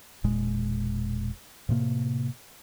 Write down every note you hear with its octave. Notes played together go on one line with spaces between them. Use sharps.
E1 A#2 G#3
A2 C3 A#3